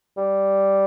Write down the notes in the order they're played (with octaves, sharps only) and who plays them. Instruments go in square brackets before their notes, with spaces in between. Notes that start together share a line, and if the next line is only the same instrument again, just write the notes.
[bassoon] G3